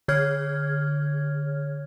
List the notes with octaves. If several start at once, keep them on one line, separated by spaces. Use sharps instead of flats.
D3 G#4 C#5 F6 G#6